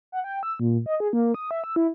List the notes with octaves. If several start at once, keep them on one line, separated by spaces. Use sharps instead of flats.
F#5
G5
E6
A#2
D#5
G#4
A#3
D#6
E5
E6
E4